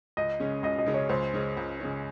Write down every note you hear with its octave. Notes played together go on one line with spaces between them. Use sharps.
C#2 D#5
C#3 G#3 C#4
C#2 D#5
D#5
C#3 G#3 C#4
C#5
C#2 C5
C#3 G#3 C#4
C#2
C#3 G#3 C#4